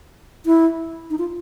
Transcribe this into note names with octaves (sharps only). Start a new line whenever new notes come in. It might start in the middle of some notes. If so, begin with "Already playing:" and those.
E4
D#4
F4